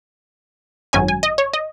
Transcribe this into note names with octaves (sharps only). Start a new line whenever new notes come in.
G#1 F#2 F#3 C#4 G#5
G#5
D#5
C#5
D#5